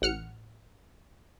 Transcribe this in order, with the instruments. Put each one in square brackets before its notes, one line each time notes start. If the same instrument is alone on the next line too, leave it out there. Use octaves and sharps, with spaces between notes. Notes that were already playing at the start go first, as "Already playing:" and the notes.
[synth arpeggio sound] A1 F#5 F6 C#7